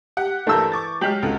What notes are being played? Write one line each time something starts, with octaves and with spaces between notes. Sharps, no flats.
G4 F#5
G2 E3 A3 A#4 A5 E6 G6
C#6 D6 A6
F#3 G#3 G4 F6 G6 B6 F#7
C#2 F#4 A4